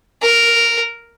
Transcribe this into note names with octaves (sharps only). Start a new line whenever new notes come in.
A#4